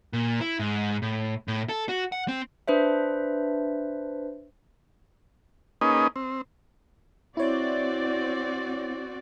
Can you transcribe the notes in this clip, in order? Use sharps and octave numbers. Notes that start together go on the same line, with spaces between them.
A#2
E4
G#2
A2
A2
A4
F#4
F#5
C4
D4 B4 C5 E5
A#3 C#4 D#4 G#4 B4 D#5
C4
C4 E4 F#4 C#5 D5